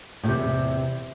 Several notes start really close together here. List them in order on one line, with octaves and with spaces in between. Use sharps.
A2 C3 E2